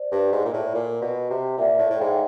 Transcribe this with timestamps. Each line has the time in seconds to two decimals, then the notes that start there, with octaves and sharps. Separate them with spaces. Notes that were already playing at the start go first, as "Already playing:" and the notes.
Already playing: C5 D5
0.11 G2
0.32 G#2
0.45 A#2
0.53 A2
0.74 A#2
1.01 B2
1.30 C3
1.57 A#2 D5 E5
1.79 A2
1.90 A2
1.99 G#2 F5 G5